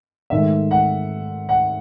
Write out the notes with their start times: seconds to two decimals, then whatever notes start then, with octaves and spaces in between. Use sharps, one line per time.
0.30 G#2 D#3 A3 E5
0.71 F#5
1.49 F#5